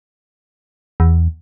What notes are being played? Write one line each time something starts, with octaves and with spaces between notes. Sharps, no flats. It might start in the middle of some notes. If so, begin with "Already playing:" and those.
E2